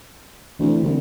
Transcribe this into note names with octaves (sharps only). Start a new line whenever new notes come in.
D2 E3 C4
C2 D3